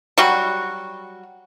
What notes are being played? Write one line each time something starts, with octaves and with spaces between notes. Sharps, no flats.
F#3 G3 F#4